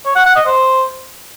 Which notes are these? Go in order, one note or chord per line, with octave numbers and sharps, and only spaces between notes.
C#5
F#5
F#5
D#5
C5